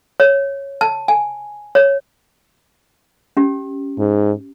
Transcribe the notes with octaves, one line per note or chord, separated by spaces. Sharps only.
C#5
A5
G#5
C#5
C#4 G4
G#2